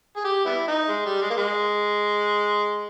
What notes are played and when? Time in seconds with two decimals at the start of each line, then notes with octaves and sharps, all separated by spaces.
0.16 G#4
0.24 G4
0.46 G3 B3 E4
0.68 D#4
0.88 G#3
1.05 G3
1.22 G#3
1.30 A#3
1.37 G#3